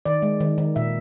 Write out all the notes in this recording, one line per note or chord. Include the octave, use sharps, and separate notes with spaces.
D#3 D5
G#3
D#3
D#3
A#2 E5